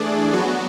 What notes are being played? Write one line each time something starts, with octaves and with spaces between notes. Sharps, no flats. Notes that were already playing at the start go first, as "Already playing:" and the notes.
Already playing: E3 A3 D4 G#4 D5
F#3 B3 F#4